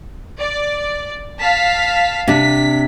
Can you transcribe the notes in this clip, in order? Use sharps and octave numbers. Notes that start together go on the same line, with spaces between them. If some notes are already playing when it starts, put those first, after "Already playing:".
D5
F5 A5 B6
C3 D4 B6